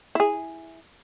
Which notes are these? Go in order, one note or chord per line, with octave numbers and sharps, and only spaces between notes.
E4 G#4